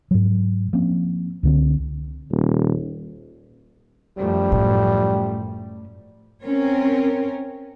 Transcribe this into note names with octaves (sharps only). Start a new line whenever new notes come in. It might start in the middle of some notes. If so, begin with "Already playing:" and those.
G#2 F#3
F3 A#3 C4 C#4
C#2 D3 C4
D#1
F#2 F3 G3 A3
A2
C4 C#4 A#4 C#5